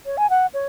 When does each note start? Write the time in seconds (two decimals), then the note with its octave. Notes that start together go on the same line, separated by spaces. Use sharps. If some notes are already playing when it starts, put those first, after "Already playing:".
0.06 C#5
0.17 G#5
0.30 F#5
0.54 C#5